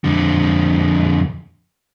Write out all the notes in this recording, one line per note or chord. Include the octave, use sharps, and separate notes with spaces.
F2 D3